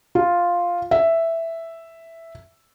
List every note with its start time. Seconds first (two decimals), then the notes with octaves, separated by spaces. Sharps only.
0.15 F4
0.91 E5